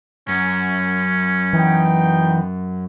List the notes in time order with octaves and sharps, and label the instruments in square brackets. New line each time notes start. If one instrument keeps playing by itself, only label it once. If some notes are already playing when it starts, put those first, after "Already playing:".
[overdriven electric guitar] F#2 [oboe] C#4
[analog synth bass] E3 [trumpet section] B3 D#4 G5